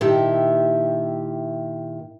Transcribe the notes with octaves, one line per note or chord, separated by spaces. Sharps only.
A#2 D#3 E4 G4 E5 A5